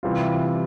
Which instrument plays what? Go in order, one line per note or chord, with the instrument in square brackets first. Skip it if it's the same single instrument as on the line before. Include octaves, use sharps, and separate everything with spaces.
[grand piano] C3 E3 G3 C4 F4